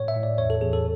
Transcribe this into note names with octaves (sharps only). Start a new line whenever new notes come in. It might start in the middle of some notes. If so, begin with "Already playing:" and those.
Already playing: A2 C#5
E5
A2
D5
E2 C#5
A4
E2 G#4
A4